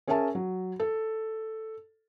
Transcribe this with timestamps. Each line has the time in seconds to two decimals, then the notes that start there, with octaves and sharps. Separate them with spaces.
0.08 C#4 G#4 A#4 E5 G#5 A5
0.35 F#3
0.80 A4